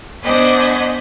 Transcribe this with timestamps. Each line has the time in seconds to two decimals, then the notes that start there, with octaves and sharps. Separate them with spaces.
0.23 B3 D4 C5 D#5 F#5 G#5